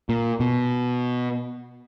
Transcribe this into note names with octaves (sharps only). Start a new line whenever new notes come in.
A#2
B2